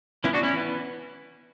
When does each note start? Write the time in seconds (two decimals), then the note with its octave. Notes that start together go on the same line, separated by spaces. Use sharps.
0.24 E3 B3 C#4 E4
0.33 D4 F#4
0.43 C#4 E4
0.53 E3 B3